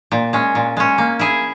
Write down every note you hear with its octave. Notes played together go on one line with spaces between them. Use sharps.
A#2
G#3 C#4
A#2
G#3 C#4
A#3
E4 G#4